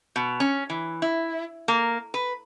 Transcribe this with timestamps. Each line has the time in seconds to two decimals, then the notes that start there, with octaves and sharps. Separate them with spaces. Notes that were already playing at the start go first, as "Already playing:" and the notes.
0.16 B2
0.40 C#4
0.70 E3
1.02 E4
1.68 A#3
2.14 B4